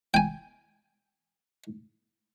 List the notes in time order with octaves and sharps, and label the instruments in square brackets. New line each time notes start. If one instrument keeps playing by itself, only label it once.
[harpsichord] G5 G#5